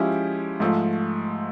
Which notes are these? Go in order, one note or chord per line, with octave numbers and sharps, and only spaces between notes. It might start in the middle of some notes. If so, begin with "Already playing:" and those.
Already playing: F3 G#3 C#4 E4 G4
G#2 F3 A3